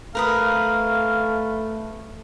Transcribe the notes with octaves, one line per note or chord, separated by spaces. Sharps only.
A3 A#4 B4 F5 D#6